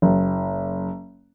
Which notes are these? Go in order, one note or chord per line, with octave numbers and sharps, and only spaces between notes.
F#1